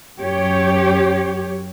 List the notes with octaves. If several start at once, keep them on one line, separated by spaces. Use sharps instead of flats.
F#2 G4 C#5